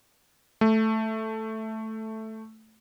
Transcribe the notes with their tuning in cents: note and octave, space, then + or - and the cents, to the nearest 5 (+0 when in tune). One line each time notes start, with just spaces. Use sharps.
A3 +0